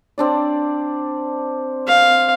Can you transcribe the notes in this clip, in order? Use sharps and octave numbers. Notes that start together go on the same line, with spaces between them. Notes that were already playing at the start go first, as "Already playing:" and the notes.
C4 D4 D5
F5